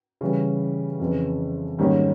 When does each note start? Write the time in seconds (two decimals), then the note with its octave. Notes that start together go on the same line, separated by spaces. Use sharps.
0.21 C#3 E3 G3
1.00 F2 C#3 E3
1.78 G#2 D#3 G3 A#3 C#4